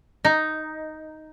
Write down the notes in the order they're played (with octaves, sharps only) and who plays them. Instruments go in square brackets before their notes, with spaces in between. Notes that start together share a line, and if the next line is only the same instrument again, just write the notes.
[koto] D#4